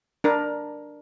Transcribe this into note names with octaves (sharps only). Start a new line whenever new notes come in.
D4 A#4